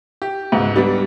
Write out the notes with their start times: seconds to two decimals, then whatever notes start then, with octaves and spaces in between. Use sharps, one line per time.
0.22 G4
0.52 C#2 G#2 B2
0.76 G3 B3 D4